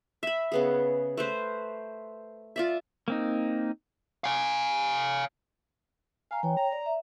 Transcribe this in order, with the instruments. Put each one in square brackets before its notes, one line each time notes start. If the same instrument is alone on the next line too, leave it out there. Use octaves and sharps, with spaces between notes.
[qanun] E5 B5
C#3 B3 G#4
A3 B4 C5
F4 D5 E5
[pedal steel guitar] A#3 C4 D#4
[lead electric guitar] F5 G#5
[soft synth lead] F5 [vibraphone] G#5 A#5
[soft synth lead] E3 [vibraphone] C#5 G5
[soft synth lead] A#5
[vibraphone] D5
E5